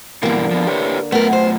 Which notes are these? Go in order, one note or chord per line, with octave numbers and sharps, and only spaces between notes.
G2 B2 D3 E3 A#3
F3 B3
G4 B4 C#5
F#2 A3 B3 A#4
C5